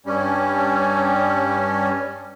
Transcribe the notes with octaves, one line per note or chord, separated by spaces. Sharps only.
G2 G3 C#4